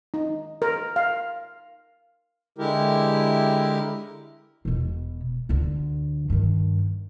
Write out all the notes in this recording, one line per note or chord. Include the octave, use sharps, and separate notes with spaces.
D#4
A#4
F5
D3 G#3 E4 G4 A#4
E1 B2
D2 D3
G2 D#3